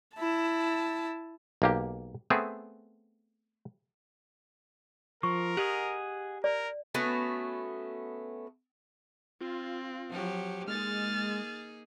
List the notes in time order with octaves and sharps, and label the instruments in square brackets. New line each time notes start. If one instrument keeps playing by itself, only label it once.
[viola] E4 A5
[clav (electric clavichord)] B1 A#3 G4
A3 B3 C4 G#4
[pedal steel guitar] F3 [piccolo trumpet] A#4 [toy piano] C#6
[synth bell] G4 [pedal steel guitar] G#4 D#5 F#5
[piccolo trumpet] A#4 [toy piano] D5
[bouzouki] A3 B3 C#4 F#4
[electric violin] C4 [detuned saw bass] F4
[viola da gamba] F3 F#3 G4
[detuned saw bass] G#3 [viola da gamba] A#3 D#4 G#4 [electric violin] F6 A6